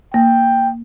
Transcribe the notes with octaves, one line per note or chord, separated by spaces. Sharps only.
A#3 G5